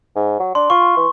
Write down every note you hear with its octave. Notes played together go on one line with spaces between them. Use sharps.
G#2
F#3
D4 C6
F4 C#6
E3